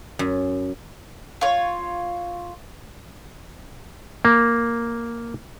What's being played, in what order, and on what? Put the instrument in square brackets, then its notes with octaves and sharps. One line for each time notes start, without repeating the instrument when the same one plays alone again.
[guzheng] F#2
[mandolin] F4 C#5
[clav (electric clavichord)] A#3